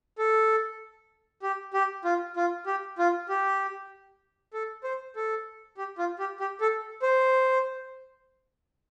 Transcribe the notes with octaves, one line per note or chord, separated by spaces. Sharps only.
A4
G4
G4
F4
F4
G4
F4
G4
A4
C5
A4
G4
F4
G4
G4
A4
C5